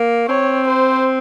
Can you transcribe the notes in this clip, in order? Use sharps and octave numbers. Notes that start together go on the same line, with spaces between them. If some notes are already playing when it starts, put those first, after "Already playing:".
Already playing: A#3
C4 C#5
C5